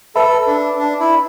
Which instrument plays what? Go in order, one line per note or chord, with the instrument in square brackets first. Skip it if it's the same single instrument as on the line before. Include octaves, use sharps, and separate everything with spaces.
[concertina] A4 [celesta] B4 E5 B5
[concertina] D4
D4
E4